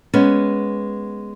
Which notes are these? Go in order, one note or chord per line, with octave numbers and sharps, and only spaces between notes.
G#3 B3 C#4